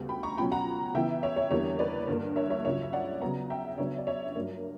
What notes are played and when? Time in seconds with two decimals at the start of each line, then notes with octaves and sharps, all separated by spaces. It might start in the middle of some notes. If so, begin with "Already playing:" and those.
Already playing: D2 C#3 G3 B3
0.09 G5 B5
0.23 A#5 C#6
0.37 C#2 B2 F#3 C#4 G5 B5
0.52 F#5 A#5
0.94 C#3 E3 B3 E4 E5 G5
1.23 C#5 E5
1.36 C#5
1.51 E2 D3 G3 A#3 C#5
1.79 B4 D5
2.08 G2 D3 A#3
2.36 C#5 E5
2.50 C#5 E5
2.65 C#2 C#3 F#3 C#5 E5
2.82 E5
2.93 D5 F#5
3.21 C#3 F#3 B3 F#5 A#5
3.50 E5 G5
3.78 C#3 F#3 B3 D4 C#5 E5
3.98 D5
4.07 C#5 E5
4.35 G2 F#3 A#3